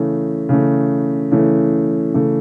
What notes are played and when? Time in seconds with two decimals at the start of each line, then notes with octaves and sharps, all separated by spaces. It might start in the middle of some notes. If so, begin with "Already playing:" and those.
Already playing: C#3 E3 A3
0.49 C#3 E3 A3
1.31 C#3 E3 A3
2.14 C#3 E3 A3